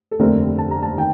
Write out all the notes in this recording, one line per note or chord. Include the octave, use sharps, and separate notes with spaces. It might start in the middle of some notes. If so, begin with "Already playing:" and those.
A4
F1 D#2 D3 A3 C4 A#4
A5
A#5
A5
D#3 G5